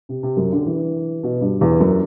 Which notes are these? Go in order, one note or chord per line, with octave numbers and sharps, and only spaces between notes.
C3
C3
F#2
D3
E3
B2
G2
E2
F#2